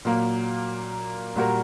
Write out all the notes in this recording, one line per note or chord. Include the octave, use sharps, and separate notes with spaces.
A#2 F#3 A#3
A#2 G3 A#3 F#4 A#4